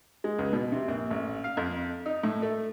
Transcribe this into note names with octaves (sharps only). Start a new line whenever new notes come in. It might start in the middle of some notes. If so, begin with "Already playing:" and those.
G#3
C#2
B2
C3
A#1
A1
F5
F2
D#4
A2
A3